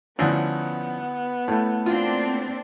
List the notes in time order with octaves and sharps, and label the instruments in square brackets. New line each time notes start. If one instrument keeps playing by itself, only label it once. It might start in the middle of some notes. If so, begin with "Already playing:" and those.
[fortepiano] D2 A2 [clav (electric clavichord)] F3 C#4 D4 [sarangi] B3
[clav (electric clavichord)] A2 A3
[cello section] A#3 C4 D4 [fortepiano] F4